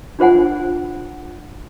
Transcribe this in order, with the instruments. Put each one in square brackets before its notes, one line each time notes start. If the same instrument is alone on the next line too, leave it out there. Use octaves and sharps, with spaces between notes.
[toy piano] D4 F4 C5 F#5 G#5